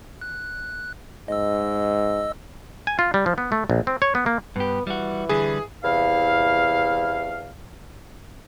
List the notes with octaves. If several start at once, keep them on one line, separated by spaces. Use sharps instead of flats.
F#6
G#2 D#5 E6
G#5
F4
G3
F3
B3
A3
A#1
C4
C#5
B3
A#3
G2 B3 G4
E3 G3 F#4
D3 G3 G#4 B4
E2 C3 E4 F5